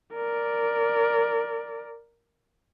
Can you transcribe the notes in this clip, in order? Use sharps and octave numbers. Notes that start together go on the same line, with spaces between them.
A#4 D5